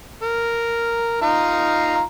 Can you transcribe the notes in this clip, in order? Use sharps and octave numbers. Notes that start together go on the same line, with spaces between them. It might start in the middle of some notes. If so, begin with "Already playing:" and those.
A#4
D#4 F4 A#5